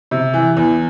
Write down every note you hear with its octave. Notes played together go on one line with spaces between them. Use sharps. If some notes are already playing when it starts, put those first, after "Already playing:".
C3
E3
E2